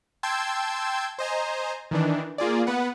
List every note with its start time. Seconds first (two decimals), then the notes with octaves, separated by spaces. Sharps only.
0.23 G5 A5 C6 E6 G6 G#6
1.19 C5 D#5 G#5 A#5
1.91 D#3 E3 D4
2.38 A#3 F4 G#4 D5
2.67 B3 B4 F#5